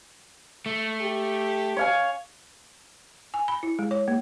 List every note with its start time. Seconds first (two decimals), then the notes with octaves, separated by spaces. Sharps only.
0.66 A3
1.01 G4
1.77 C#5 F5 G#5
3.34 G#5
3.48 B5
3.63 E4
3.79 G#3
3.91 C#5
4.08 A#3